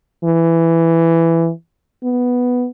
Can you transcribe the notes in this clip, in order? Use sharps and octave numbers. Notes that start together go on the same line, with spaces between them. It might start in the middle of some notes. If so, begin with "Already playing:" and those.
E3
B3